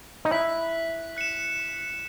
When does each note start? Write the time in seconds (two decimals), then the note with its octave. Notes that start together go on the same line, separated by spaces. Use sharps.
0.25 D#4
0.31 E4 F#6 B6 F#7
1.17 F#6 C#7 E7